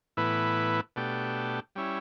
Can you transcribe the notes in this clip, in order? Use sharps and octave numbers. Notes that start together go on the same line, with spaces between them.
A2 E3 B3 E4 B4
B2 A3 D4 G4
G3 C#4 E4